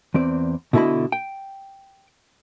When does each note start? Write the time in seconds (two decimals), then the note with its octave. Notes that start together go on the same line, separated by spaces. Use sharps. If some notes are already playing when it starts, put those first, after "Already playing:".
0.14 E2 C4 D5
0.73 B2 D3 E4 A4 D#5 B5
1.12 G5